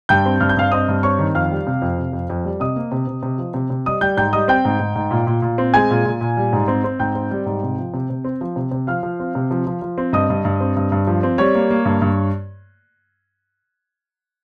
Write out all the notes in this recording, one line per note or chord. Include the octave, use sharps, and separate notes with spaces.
G2 G5 G6
C4
G2 F6
G6
G2 F5 F6
C4 D#5 D#6
G2
C4 C#5 C#6
D#3
F2 F5 F6
G3
C3
F2
C3
F2
F2
G3
C3 D#5 D#6
A#3
C3
C3
C3
F3
C3
C3
G3 D#5 D#6
G3 G5 G6
G#2 G5 G6
G3 D#5 D#6
C4 G5 G6
G#2
G#2
G#2
A#2
A#2
A#2
C4
G#3 G#5 G#6
A#2
A#2
A#2
G3
G#2
C4
C4
G#2 G5 G6
C4
G3
G#2
C3
F3
C3
C3
C4
F3
C3
C3
F3 F5 F6
F3
C4
C3
F3
F3
F3
C4
G2 D#5 D#6
G2
G2
C4
G2
G2
F3
C4
G3 C#5 C#6
A#3
A#3
G2
G2